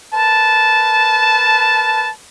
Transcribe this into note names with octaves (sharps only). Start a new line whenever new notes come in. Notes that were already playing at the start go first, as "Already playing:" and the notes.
A#4 B4 A5